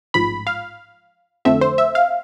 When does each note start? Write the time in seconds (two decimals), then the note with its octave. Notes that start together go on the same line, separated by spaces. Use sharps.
0.14 A1 G#2 F3 B5
0.47 F5
1.45 F2 D3 A3 C4 E5
1.61 C5
1.78 E5
1.95 F5